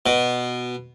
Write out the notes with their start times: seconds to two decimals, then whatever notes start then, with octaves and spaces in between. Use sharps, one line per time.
0.06 B2